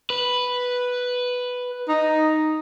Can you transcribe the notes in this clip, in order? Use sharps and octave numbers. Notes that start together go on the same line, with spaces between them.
B4
D#4